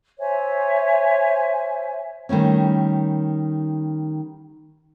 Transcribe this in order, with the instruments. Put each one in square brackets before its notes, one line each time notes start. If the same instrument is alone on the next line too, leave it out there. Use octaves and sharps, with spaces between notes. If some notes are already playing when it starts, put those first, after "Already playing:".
[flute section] C5 C#5 E5 G#5
[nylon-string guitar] D#3 G3 A3 C#4